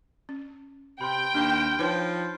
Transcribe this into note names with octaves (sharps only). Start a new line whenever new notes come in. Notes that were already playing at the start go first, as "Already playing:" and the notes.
C#4
C3 G5 B5 C6
D#2 D4 F6 G6
F3 D#4 B4 C#5